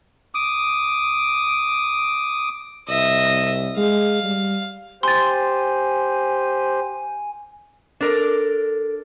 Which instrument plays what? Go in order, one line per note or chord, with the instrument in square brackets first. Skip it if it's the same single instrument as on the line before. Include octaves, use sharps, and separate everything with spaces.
[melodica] D6 D#6
[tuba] C2 [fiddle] D#5 E5
[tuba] G#3 [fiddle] F5
[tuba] G3
[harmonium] G4 C5 [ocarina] G#5 [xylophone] C6 A6
[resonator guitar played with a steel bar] D4 A#4 D5 [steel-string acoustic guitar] A4 C5